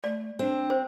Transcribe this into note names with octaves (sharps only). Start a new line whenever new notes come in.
A3 D5
C4 D4
C5